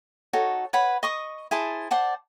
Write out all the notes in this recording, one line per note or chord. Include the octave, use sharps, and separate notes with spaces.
D#4 F#4 A4 C#5
B4 C#5 F#5 B5
D#5 C#6 D#6
E4 G#4 C5 A5
C5 D5 F#5 A5